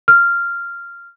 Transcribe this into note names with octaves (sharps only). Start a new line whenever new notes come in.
F6